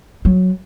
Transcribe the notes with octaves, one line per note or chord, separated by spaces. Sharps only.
F#3